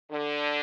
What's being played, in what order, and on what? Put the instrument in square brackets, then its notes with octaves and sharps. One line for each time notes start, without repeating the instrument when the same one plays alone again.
[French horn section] D3